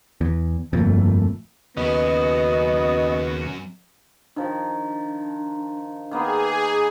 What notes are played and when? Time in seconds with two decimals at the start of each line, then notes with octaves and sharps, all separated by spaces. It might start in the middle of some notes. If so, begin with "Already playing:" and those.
0.21 E2
0.73 G1 F2 A#2 A3
1.77 D#2 C#3 F#3 B3 C#4 F#4 D#5
4.36 D#3 F3 D4
6.11 D#3 A#3 B3 G#4